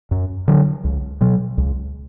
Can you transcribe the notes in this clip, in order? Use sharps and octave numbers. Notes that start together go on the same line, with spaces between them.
F#2
D3 F#3
C#2
B2 F#3
C#2